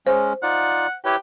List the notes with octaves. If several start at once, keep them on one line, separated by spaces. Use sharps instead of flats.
G#3 C#4 C5
D#4 F4 D5 F#5
E4 G4 B4 C#5